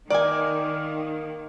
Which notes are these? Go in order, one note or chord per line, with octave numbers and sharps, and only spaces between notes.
D#3 A#3 D#4 D5 G#5